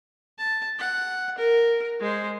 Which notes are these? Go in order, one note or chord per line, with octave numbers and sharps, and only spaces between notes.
A5
F#5
A#4
G#3 C5